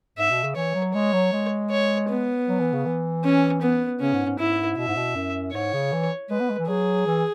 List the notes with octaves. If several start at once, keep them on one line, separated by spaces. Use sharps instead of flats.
G#2 E5
B2
C#3
E3 C#5
F#3
G#3 C#5
F#3
G#3
C#5
B3
F#3
E3
C#3
E3
C#4
B3
C#3 C#4
G#2
G#2
G#2 E4
B2 E5
G#2
B2
F#2
G#2 C#5
C#3
E3
G#3 B4
B3
G#3
E3
F#3 G#4
E3